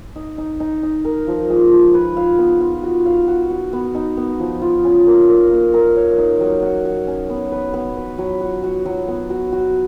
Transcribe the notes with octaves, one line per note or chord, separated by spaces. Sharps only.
D#4
D#4
D#4
D#4
A#4
F3
G#3
F3
B4
F5
B3
F4
F#4
F5
F#4
F#4
B3
D#4
B3
F3
F4
C#4
A#4
A#4
A#3
A#4
C#5
D#4
F#3
F#4
F#4
C#4
B3
B4
B3
B4
F#3
F#4
F#4
F#3
B3
F#4
F#4